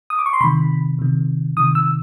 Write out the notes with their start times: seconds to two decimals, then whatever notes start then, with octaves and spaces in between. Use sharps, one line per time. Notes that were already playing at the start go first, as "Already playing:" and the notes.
0.10 D#6
0.19 D6
0.26 C#6
0.33 C6
0.41 C3 D#3 B5
0.99 C3 D#3
1.57 C3 D#3 D#6
1.75 E6